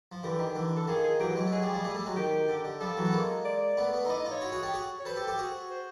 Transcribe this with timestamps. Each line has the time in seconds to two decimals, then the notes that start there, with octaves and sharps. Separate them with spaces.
0.12 F3
0.23 D3 E3 G4
0.39 D#3
0.55 D3 E3
0.76 A4
0.87 D#3 F3 G#4
1.04 G#4
1.20 E3 F#3 G4
1.28 F#4
1.36 F#3 G#3 G4
1.46 A3
1.52 F#3 G#3 G#4
1.62 F3 G3
1.74 F3 G3
1.84 G3 A3
1.95 G3 A3
2.06 F#3 G#3
2.16 D#3 G4
2.49 D3
2.64 D3
2.80 F3 G3 A4
2.97 E3 F#3
3.05 B3
3.13 G#3 A#3
3.45 D5
3.77 A3 B3
3.93 A3 B3
4.05 D#4
4.09 D4 E4 D#5
4.20 D#5
4.25 D#4 F4
4.31 C#5
4.41 E4 F#4
4.52 F#4 G#4
4.63 G4 A4
4.74 F#4 G#4
4.99 C#5
5.05 A4 B4 C5
5.16 G4 A4
5.27 G4 A4
5.38 F#4 G#4
5.70 C5